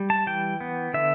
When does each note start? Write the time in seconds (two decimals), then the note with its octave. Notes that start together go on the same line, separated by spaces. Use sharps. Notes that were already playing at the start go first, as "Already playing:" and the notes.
Already playing: G3
0.10 A5
0.26 E3 G5
0.61 B3
0.94 D3 E5